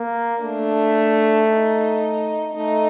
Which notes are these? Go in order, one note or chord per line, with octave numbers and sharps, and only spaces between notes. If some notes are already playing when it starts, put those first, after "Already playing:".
Already playing: A#3
A3 D4
D#4
A3 D#4